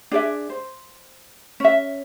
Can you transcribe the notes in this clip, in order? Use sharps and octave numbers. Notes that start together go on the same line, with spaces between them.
D4 G#4 D5 E5
C5
C#4 E5